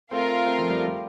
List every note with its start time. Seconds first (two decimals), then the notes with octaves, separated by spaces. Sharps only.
0.11 A3 C4 F4 A#4 F5
0.46 A3 C4
0.58 F3 A3
0.70 G3
0.78 A3
0.86 G3